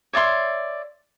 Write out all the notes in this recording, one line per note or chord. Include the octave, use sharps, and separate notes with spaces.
C#5 D5 E5 C6